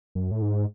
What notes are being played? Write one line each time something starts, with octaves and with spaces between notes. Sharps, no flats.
F#2
A2
G#2